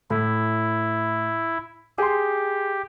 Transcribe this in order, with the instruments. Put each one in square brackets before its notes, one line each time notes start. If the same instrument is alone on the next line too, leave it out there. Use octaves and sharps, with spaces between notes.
[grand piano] A2 [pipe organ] E4
[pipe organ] G4 [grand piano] G#4 C6